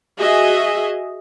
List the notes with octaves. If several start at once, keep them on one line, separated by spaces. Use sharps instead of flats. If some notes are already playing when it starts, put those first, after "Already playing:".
F#4 G#4 D#5 E5